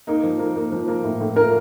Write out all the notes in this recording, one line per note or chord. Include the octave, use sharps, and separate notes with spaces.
A#3 D#4
F3
A#3
A#3
F3
A#3
A2
A2
A#3 A#4